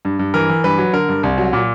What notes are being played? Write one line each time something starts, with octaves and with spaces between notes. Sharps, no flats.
G2
G2
E3 A#4
E3
G2 B4
F#3
D3 A#4
G2
C2
F#3
A#2